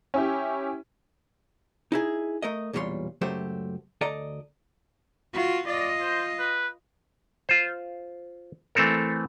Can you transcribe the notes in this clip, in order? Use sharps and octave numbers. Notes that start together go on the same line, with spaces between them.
C#4 E4 G4
D#4 E4 G#4
A3 A#4 D#5
B1 E2 A#2 G3 C#5 C6
C#2 F#2 F#3 A3 G4 C5
D2 A4 D5 D#5 A#5
F4 F#4
F4 D5 D#5
C5
B4
F4 C5
E3 A3 C4 A4 A#4